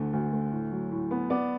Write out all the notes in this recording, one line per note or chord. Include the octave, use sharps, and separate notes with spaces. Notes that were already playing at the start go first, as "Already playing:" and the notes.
Already playing: D2 D3 A3
D2
A3
A2
F#3
A2
B3
B3 D5 D6